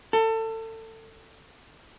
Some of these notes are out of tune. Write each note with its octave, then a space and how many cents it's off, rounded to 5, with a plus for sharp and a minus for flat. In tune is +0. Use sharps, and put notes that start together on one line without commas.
A4 +30